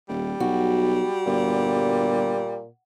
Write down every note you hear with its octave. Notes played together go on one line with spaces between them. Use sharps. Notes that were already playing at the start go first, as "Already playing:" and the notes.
D#1 G3
B1 F#4
G1 A#2